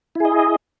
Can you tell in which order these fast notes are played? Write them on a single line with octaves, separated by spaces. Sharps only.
E4 G#4 D#5